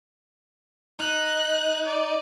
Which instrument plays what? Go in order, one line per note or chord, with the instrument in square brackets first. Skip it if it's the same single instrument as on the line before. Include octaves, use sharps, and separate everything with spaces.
[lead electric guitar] D#4 [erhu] F#6
[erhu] D5